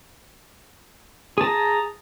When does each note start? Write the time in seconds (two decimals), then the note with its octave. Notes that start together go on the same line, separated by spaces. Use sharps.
1.38 G#4
1.41 A5
1.44 A#5